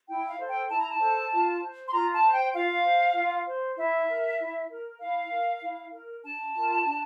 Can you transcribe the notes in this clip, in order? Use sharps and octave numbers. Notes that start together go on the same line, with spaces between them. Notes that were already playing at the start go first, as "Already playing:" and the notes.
E4 G5
F5
A4 C5
G5
E4 A5
A#5
A5
A4 C5
F4
C5
C6
F4 A#5
A5
C5
G5
F4 F5
C5
F4
C5
E4 E5
A#4
E4
A#4
E4 F5
A#4
E4
A#4
D4 A5
F4 A#4
D4